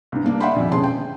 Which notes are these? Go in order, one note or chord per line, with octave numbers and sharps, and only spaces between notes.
C2 G2
G2 A#3 D4
D5 E5 F#5 G5 B5 C6
A#1 F2
E1 C#4 G#4 A5 C6
G5